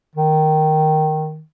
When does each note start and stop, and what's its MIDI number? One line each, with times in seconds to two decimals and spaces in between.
0.16 1.42 51